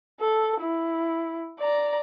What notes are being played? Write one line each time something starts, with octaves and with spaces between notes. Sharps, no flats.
A4
E4
D5 A#5